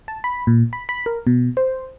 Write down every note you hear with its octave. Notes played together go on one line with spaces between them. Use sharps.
A5
B5
A#2
B5
B5
A#4
B2
C5